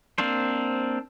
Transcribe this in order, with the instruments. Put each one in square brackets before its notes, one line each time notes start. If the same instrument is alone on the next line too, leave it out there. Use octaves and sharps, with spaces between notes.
[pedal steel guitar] A#3 C4 D4 C5